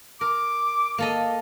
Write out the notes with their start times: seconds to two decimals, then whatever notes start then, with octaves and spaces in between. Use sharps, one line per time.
0.21 A#4 D6
0.98 A#3 A4 D#5